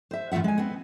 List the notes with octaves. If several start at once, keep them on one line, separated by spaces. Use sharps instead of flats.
C5 E5
E2 A2 F4 E5 F#5
G#3 G#5
B3 C4